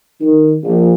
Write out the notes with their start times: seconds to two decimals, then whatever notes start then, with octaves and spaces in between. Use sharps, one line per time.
0.21 D#3
0.64 A#1